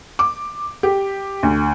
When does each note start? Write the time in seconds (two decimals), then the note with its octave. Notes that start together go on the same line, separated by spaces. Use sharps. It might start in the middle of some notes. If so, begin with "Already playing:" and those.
0.19 D6
0.83 G4
1.43 D2